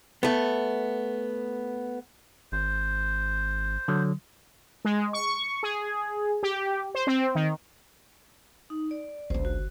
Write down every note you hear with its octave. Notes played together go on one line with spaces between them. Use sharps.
A3 B3
G#1 C5
D3 F#3
G#3
C#6
G#4
G4
C5
C4
D#3
D#4
D5
G1 C#2 D4 C5
F#4